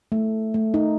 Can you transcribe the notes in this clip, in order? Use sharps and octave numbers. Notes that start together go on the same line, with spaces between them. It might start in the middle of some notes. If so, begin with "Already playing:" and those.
A3
A3
D#4